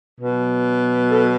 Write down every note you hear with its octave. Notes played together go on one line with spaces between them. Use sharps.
B2 F#3
A4